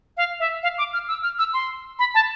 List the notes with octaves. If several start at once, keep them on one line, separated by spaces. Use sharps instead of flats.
F5
E5
F5
D6
F6
E6
F6
E6
C6
B5
A5